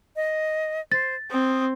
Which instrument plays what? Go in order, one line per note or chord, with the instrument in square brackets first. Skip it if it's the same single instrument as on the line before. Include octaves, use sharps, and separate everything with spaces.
[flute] D#5
[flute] C5 [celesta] A6
[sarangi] C4 [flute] D#6